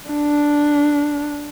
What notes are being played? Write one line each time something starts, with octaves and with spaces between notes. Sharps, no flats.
D4